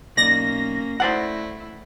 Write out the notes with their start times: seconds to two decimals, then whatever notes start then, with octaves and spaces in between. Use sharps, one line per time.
0.17 B1 A#3 C#4 D5 A#6
1.00 A3 E4 C5 D5 F#5